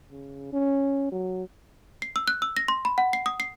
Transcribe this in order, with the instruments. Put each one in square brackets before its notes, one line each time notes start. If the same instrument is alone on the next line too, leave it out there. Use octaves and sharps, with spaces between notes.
[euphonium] C#3
C#4
F#3
[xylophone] C7
E6
F#6
E6
A#6
C6
B5
F#5
C7
D#6
C7